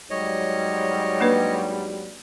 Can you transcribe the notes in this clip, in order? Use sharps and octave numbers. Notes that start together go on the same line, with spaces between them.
G#2 F#3 G3 C#5 D#5
A#3 D4 B4